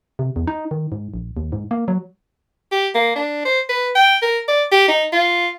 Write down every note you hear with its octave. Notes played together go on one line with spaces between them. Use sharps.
C3
E2
D#4
D#3
G#2
A#1
D#2
G#2
A#3
F#3
G4
A#3
D4
C5
B4
G5
A#4
D5
G4
D#4
F4